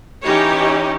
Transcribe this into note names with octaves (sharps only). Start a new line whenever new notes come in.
E3 C#4 D#4 G4 C#5